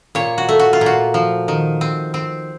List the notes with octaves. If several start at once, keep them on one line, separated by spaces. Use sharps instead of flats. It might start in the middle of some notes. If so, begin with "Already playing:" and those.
A#2 C#5
F#4
A3
F#4
F4
A#2 F#4
F3
D#3
C4
C4